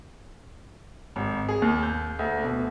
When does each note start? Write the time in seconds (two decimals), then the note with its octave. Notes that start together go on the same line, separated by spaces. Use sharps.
1.16 G#1
1.49 G#4
1.62 D#2
1.83 G6
2.19 D2
2.43 B2